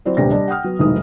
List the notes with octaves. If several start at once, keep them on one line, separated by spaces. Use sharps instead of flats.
F#3 C4 E4 D5
D#1 D2 C3 G3 B3 A#6
G3 D4 D#5
F#5 G5 D#6 F6
F#3 B3
F1 B1 G#2 E3 F#3 D#6